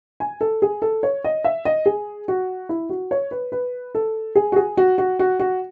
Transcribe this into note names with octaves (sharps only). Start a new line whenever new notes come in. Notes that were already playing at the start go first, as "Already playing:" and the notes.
G#5
A4
G#4
A4
C#5
D#5
E5
D#5
G#4
F#4
E4
F#4
C#5
B4
B4
A4
G#4
F#4
G#4
F#4
F#4
F#4
F#4